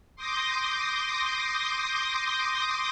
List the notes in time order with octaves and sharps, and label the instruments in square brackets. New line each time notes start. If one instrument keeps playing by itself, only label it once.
[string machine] C6 D6 D#6 G6 A#6